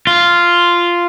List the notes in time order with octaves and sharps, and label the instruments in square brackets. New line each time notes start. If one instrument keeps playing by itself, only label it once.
[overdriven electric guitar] F4